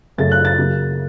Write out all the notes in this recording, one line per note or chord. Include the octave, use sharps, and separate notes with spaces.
F#2 C#3 A3 A6
F#6
A6
C#3 F#3 A#3